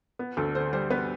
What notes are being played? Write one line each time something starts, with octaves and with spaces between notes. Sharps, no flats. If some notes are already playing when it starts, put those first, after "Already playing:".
B3
D2 A4
D3 C5
G3 C5
B3 B4